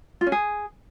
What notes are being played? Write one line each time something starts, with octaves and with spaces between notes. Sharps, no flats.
F4
C#4
G#4